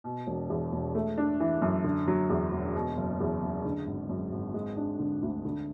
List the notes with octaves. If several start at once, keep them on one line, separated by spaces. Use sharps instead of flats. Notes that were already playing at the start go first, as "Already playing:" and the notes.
B2
E1
E2
E1
A3
D4
E3
F#2
D3
F#3
E2
E1
B2
F#1
E2
F#1
D3
G#1
F#2
G#1
G#3
D4
D3
D2
D3